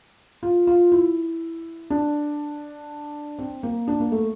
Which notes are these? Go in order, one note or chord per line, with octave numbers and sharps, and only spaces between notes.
F4
F4
E4
D4
C4
A#3
D4
A#3
A3